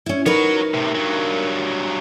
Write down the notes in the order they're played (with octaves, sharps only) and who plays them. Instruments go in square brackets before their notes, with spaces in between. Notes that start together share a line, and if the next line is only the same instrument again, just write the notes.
[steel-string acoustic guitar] C#4 E4
[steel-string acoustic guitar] D#4 A#4 B4 [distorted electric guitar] F#4 C#5
[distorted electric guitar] A2 C3
G2 F#3